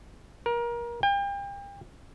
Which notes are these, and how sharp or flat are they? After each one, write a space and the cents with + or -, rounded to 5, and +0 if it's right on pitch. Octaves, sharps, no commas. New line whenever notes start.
A#4 +25
G5 +35